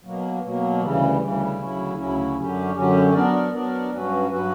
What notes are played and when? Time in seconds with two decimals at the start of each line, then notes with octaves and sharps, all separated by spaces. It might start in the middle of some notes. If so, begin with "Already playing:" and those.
0.05 B2 F#3 A#3
0.43 B2 F#3 A#3
0.82 D2 C#3 E3 G3
1.20 D2 C#3 E3 G3
1.58 D2 C#3 F#3 C#4 E4
1.97 D2 C#3 F#3 C#4 E4
2.37 F#2 D3 F#3 C#4 G4
2.75 F#2 D3 F#3 C#4 G4
3.13 F#3 B3 D4 A#4 D5
3.52 F#3 B3 D4 A#4 D5
3.91 G2 F#3 C#4 F#4 B4
4.29 G2 F#3 C#4 F#4 B4